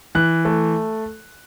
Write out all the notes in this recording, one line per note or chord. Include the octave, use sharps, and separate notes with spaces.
E3 F#6
A3